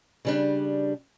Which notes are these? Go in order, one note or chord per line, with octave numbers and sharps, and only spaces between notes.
C#3 G3 D4